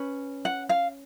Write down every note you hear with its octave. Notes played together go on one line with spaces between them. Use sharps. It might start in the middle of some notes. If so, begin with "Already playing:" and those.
Already playing: C#4 B4
F#5
F5